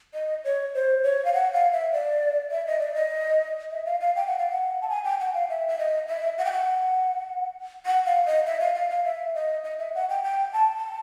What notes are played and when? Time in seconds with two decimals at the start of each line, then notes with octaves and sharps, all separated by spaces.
0.14 D#5
0.45 C#5
0.74 C5
1.03 C#5
1.25 F5
1.34 F#5
1.54 F5
1.72 E5
1.93 D5
2.51 E5
2.67 D#5
2.79 D5
2.94 D#5
3.71 E5
3.86 F5
4.00 F5
4.16 G5
4.27 F#5
4.38 F5
4.50 F#5
4.82 A5
4.89 G#5
5.04 G5
5.20 F#5
5.34 F5
5.49 E5
5.68 E5
5.79 D#5
6.08 E5
6.38 F#5
6.45 G5
6.52 F#5
7.86 F#5
8.06 F5
8.26 D#5
8.46 E5
8.60 F5
8.75 F5
8.90 F5
9.05 E5
9.35 D#5
9.64 D#5
9.79 E5
9.95 F#5
10.09 G5
10.24 G5
10.53 A5
10.77 A5